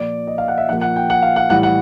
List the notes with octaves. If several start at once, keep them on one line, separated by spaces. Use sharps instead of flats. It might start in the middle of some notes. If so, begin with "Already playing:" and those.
Already playing: A#2 F3 A#3 D5
D#5
F5
F#5
E5
A#2 F3 A#3 F#5
F#5
G5
F#5
F5
F#5
A2 E3 G3 F#5
F#5